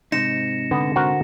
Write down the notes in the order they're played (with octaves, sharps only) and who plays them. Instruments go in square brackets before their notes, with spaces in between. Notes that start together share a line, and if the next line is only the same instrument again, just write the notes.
[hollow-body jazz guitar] G#2 C3 D#4 [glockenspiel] A#6 C#7 E7
[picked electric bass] D3 [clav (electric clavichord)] B3
[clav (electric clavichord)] F#4 A#4 C5